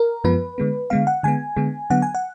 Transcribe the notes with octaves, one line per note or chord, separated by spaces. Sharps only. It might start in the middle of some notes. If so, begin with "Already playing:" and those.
Already playing: A#4
F#2 F3 G#3 B3 B4
D3 G#3 B3
D3 G#3 B3 F5
F#5
D3 G#3 B3 G#5
D3 G#3 B3
D3 F#3 B3 F#5
G#5
F#5